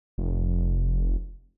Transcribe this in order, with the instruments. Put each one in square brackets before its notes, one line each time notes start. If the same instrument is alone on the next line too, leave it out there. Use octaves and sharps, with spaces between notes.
[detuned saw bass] F1